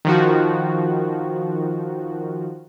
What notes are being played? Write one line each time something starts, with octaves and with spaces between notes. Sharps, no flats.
D#3 F3 F#4